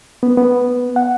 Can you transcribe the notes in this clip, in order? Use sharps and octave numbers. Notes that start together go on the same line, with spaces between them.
B3
B3
F#5